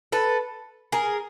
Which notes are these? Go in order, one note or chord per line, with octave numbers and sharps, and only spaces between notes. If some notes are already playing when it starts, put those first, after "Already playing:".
A4 B4
G#4 A#4